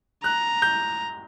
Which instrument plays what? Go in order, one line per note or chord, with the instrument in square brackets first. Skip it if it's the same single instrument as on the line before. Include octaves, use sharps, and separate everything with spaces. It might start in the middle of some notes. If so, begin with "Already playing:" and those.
[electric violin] A#5 [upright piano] F#6
[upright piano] G6